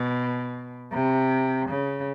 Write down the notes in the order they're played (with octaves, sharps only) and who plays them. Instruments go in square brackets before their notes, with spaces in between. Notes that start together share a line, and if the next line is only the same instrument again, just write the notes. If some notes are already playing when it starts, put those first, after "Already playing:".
Already playing: [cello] B2
C3
C#3